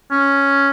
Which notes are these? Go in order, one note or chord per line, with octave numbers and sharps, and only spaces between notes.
C#4